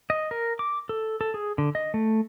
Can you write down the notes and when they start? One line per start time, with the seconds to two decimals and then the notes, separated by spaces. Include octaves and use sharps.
0.10 D#5
0.31 A#4
0.59 D6
0.89 A4
1.21 A4
1.34 G#4
1.58 D3
1.75 D#5
1.94 A3